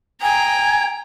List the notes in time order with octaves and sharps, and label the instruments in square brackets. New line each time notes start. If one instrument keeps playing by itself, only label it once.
[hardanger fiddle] G5 A#5 [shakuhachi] G#5